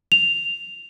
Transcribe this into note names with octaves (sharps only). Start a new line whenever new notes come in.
F7